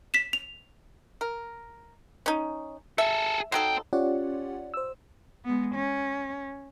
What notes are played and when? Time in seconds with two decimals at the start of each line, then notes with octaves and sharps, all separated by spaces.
0.14 B6 E7
0.33 F7
1.21 A#4
2.26 C#4 D#4
2.98 G#4 A4 E5
3.52 F#3 D#4 A4 C5 G5
3.93 C#4 F4 G4 C#5 D5 F#5
4.74 C5 E6
5.45 G#3 B3
5.75 C#4